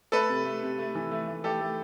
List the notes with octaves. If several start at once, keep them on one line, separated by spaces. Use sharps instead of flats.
A3 A4 B4
C3
A3
C3
A3
E3
A3
A3
A3 G4 A4
A3